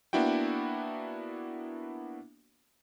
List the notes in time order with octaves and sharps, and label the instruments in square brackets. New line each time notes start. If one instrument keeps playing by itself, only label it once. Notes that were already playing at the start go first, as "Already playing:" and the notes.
[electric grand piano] A#3 B3 D4 E4 F#4 G5